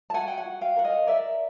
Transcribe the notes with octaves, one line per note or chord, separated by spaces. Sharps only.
A5
F#4 F#5 G#5
G5
F#5 G#5
F#4
F5 G5
A#4 F#5
D#5 F5
A#4 D5 E5